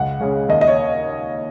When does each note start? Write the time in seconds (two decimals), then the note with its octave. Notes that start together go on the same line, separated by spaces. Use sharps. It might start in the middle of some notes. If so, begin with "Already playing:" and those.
Already playing: C#2 F#5
0.20 C#3 G#3 C#4
0.49 D#2 D#5
0.61 D#5
0.67 C#5